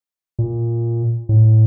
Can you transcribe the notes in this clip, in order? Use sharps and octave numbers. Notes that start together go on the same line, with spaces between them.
A#2
A2